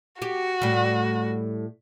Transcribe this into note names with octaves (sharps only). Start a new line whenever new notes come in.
F#4 G4
A2 G3